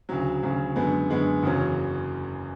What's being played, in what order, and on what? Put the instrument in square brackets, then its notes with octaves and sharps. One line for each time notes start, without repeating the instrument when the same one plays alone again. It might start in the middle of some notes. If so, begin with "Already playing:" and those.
[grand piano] D2 C#3 F#3
D2 C#3 F#3
F#2 D3 G#3 B3
F#2 D3 G#3 B3
F#1 E2 C#3 F#3 C#4